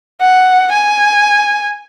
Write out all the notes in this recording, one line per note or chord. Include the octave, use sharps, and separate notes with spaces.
F#5
G#5